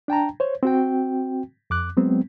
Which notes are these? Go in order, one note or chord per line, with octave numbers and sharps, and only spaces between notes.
D4 G5 A5 A#5
C5 C#5
C4 F#4 G5
F2 D6 F#6
F#3 G#3 B3 C4